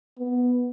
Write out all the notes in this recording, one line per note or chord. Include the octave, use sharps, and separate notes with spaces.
B3